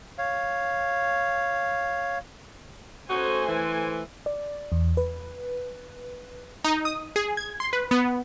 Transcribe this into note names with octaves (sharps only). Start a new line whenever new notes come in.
C#5 F5
A3 C#4 D#4 F#4 C5 G#5
E3
D5
E2
B4
D#4
D#6
G#4
G#6
C6
B4
B3